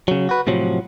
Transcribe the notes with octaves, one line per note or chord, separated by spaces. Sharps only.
C#3 F#3
F#4 B4
A2 C3 F3 F#3